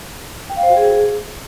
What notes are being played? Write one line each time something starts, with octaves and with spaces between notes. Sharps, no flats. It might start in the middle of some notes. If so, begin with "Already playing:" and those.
G5
F5
C5
F#4
G#4